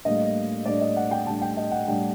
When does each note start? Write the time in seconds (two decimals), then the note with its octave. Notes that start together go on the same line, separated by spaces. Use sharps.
0.05 A2 G3 A#3 D4 D#5
0.66 A2 G3 A#3 D4 D5
0.81 D#5
0.97 F#5
1.11 G5
1.26 A2 G3 D4 A5
1.41 G5
1.57 D#5
1.72 F#5
1.87 A2 G3 D4 G5